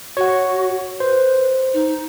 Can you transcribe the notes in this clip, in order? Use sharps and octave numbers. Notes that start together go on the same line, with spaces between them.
F#4 C#5 F#5
B4 C5
D#4